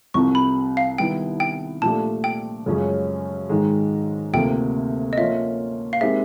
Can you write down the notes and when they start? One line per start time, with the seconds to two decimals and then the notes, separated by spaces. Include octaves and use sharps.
0.14 C2 C3 F3 C#6
0.35 B5
0.77 F5
0.98 D#3 G3 B3 E4 G5
1.40 G5
1.82 A#2 F3 A3 D4 G4 A5
2.24 G5
2.66 F#2 C#3 F3 G#3 C#4
3.49 G#2 D#3 G#3
4.33 D2 C3 F3 A#3 G5
5.13 D#5
5.18 F3 A#3 C#4 F4 E5
5.93 F5
6.01 G#3 C4 D#4 G4 A#4 E5